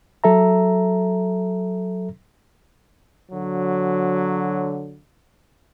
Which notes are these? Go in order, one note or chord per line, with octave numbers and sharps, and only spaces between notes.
F#3 A4 E5 A#5
D3 F#3